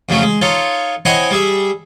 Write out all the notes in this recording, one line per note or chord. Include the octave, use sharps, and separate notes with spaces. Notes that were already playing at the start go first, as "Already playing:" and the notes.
F2 C#3 F#3 A3 C#4
G#3
D#4 F4 A4 C#5
C4 E4 C#5 D#5 F#5 G#5
G3 G#4 E5